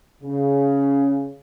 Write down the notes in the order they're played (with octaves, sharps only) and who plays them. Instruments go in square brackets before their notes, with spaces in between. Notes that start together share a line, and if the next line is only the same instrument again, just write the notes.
[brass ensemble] C#3